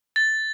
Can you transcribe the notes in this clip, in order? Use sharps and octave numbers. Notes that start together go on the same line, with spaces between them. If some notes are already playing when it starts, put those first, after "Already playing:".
A6